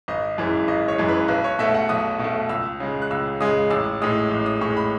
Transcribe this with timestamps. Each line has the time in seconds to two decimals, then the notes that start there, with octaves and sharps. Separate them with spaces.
0.08 G#1 D#5
0.38 F#2 E3 G#3
0.68 G#1 D#5
0.88 C#5
0.98 F#2 E3 G#3
1.08 B4
1.28 B1 B4
1.44 C#5
1.59 B2 A3 E5
1.74 F#5
1.89 B1 D#6
2.19 B2 A3
2.49 C#2 E6
2.80 C#3 G#3
3.02 F#6
3.10 C#2 E6
3.41 C#3 G#3 D#6
3.70 A1 E6
4.02 A2 G#3 D#6
4.31 A1
4.46 D#6
4.61 A2 G#3 C#6
4.77 B5